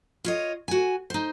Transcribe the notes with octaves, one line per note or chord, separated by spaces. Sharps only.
F4 C#5 D#5
F#4 G#5
D#4 C5